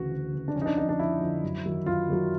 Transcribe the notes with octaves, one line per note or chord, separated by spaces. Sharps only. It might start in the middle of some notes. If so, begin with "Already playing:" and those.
Already playing: D2 C#3 E3 F#4
D2
C#3 E3
D4
F2 C#4
D#4
D4
D3 F3 D#4
D4
F2 E4
D3 F3
F#2
D#3 F#3
F#2 F4
D#3 F#3